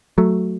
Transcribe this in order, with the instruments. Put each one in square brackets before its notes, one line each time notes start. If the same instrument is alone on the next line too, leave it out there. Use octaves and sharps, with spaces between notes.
[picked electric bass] F#3 A3